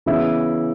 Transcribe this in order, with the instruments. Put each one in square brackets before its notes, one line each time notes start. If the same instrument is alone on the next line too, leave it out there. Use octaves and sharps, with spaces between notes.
[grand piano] C#3 E3 B3 E4